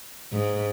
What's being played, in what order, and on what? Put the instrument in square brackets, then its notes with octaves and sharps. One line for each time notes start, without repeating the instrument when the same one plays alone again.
[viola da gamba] G#2